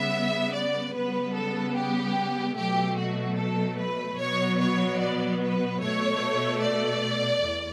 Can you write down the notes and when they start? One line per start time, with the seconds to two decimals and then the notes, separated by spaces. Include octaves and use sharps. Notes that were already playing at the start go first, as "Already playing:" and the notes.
Already playing: C#3 G3 B3 E5
0.54 D5
0.94 C#3 G3 B3 B4
1.34 A4
1.75 G4
2.55 B2 F#3 A3 G4
2.97 F#4
3.37 A4
3.78 B4
4.18 B2 F#3 B3 C#5
4.58 C#5
5.00 D5
5.40 B4
5.80 B2 A3 C#5
6.61 D5
7.43 E2